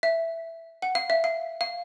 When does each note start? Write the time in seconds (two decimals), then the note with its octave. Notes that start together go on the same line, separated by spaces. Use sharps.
0.03 E5
0.82 F#5
0.95 F5
1.10 E5
1.24 F5
1.61 F5